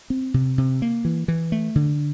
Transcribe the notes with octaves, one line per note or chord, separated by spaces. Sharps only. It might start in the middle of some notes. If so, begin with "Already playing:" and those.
C4
C3
C3
A#3
E3
E3
A3
D3